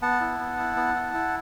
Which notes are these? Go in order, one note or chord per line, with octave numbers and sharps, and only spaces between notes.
B3 F#5 A5
E4
B3
E4
B3
E4
E4